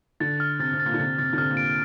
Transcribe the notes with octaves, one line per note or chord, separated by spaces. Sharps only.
D3 A6
F6
C3 A6
C3
A6
A#2
D3
C3 A6
C3 A6
D3
C3 F6
A#2
D7